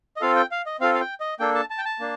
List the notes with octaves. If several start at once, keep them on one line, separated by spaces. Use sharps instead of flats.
D#5
C4 F4 A4 F5
G5
F5
D#5
C4 F4 A4 F5
F5
G5
D#5
A#3 D4 A4 G5
A5
A5
G5
A5
A#3 D4